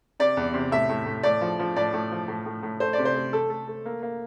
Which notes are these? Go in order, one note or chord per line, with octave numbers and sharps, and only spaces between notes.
C3 D5
E2
C3
A2 E5
A2
A2
A2 D5
F3
F3
A2 D5
A2
F3
A2
A2
A2
A3 C5
D5
C3
C5
A3
A3 A4
A3
A3
A#3
A#3